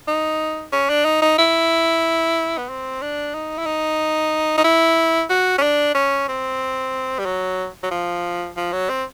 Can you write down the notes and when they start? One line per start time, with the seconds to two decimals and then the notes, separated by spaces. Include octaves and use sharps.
0.08 D#4
0.73 C#4
0.90 D4
1.05 D#4
1.22 D#4
1.38 E4
2.58 B3
2.69 C4
3.02 D4
3.35 D#4
3.58 E4
3.66 D#4
4.58 D#4
4.64 E4
5.30 F#4
5.58 C#4
5.62 D4
5.95 C#4
6.29 C4
7.19 G3
7.26 F#3
7.83 F#3
7.91 F3
8.57 F3
8.73 F#3
8.89 C4